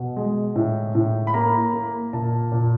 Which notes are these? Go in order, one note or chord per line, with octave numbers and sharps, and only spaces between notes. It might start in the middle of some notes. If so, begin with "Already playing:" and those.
Already playing: B2
G#3
A2
A2
B5
A#3 A#5
A#3
A#2 A5
A#2